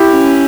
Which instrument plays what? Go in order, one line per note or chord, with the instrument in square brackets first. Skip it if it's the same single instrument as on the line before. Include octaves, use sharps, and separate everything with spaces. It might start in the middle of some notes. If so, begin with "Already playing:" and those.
Already playing: [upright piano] E4 G4
[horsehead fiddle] C#4